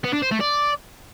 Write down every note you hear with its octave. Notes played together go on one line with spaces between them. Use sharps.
B3
D4
C5
A3
D5